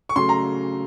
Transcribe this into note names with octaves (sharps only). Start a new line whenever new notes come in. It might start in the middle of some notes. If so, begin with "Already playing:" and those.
C#6
C#3 F#3 A3 C6
A#5